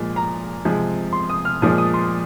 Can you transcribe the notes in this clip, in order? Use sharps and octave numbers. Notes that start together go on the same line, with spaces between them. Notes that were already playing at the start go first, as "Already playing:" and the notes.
Already playing: A#2 F3 G#3
A#5
C3 F3 G#3
C6
D#6
F6
A#2 F3 G#3 D#6
D#6
C6